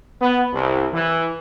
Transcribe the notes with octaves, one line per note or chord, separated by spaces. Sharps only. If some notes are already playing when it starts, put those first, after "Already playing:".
B3
C2
E3